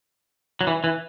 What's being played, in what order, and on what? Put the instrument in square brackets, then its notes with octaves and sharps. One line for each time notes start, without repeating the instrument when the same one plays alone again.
[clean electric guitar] F#3
E3
E3